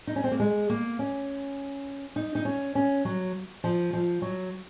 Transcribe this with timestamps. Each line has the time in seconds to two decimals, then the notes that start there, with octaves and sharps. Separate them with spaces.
0.07 D#4
0.16 C#4
0.24 C4
0.31 A#3
0.39 G#3
0.70 A#3
0.99 C#4
2.16 D#4
2.35 D#4
2.45 C#4
2.75 C#4
3.05 F#3
3.64 F3
3.93 F3
4.22 F#3